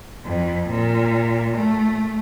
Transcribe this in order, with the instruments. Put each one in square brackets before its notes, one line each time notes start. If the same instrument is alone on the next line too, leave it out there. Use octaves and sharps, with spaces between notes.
[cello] F2
A#2
A3